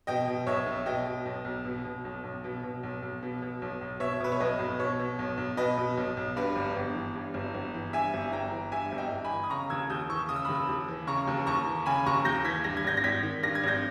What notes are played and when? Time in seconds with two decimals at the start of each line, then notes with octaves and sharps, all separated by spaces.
0.07 B2 D#5 G5
0.27 B2
0.47 B1 C#5 E5
0.66 B1
0.86 B2 D#5 G5
1.06 B2
1.25 B1
1.45 B1
1.65 B2
1.85 B2
2.05 B1
2.23 B1
2.44 B2
2.63 B2
2.83 B1
3.02 B1
3.23 B2
3.42 B2
3.62 B1
3.81 B1
4.00 B2 C#5 E5
4.20 B2 B4
4.32 C#5
4.40 B1 B4 D#5
4.59 B1
4.79 B2 C#5
4.99 B2
5.19 B1
5.37 B1
5.57 B2 B4 D#5
5.78 B2
5.97 B1
6.17 B1
6.36 G2 B4
6.56 G1
6.76 G1
6.95 E3
7.15 G2
7.34 G1
7.54 G1
7.74 E3
7.93 G2 E5 G#5
8.14 G1
8.32 G1 G5 A#5
8.52 E3
8.72 G2 E5 G#5
8.92 G1
8.98 D#5 G5
9.11 G1
9.24 G#5 B5
9.31 E3
9.44 D#6
9.50 C#3 A#5 C#6
9.70 D#2 E6 G#6
9.90 D#2 D#6 G6
10.09 E3 C#6 E6
10.29 C#3 D#6
10.36 E6
10.45 D#2 B5 D#6
10.69 D#2
10.88 E3
11.07 C#3 A#5 C#6
11.27 D#2
11.46 D#2 A#5 C#6
11.66 E3
11.86 C#3 G#5 B5
12.06 D#2 A#5 C#6
12.25 D#2 G6 A#6
12.45 E3 G#6 B6
12.64 G2 A#6
12.77 G#6
12.84 G#1 G6 A#6
12.97 A#6
13.04 G#1 G#6 B6
13.23 D#3
13.43 G2 A#6
13.55 G#6
13.63 G#1 G6 A#6